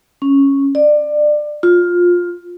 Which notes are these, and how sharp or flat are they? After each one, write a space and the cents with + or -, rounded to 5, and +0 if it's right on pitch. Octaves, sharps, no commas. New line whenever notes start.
C#4 -5
D5 +25
F4 +15